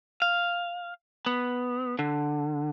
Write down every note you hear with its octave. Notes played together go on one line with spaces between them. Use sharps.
F5
B3
D3